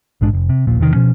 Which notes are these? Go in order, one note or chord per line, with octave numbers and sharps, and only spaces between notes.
A#1 G#2 G#3 D4
F1
C3
D#1 A#1 A#2
E2 C3 D#3
B2 F3 C#4